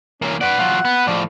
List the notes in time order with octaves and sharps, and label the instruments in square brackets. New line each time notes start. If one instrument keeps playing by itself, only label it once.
[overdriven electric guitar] E3 A#3 [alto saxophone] C#4
[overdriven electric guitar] B4 D5 [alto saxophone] F#5
[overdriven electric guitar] F#3 F4
B3
[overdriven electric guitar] A2 F3 [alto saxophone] D5